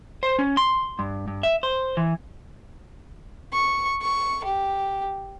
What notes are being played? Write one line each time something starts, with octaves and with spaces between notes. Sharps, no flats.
C5
C#4
C6
G2
G2
E5
C5
E3
C#6
C#6
G4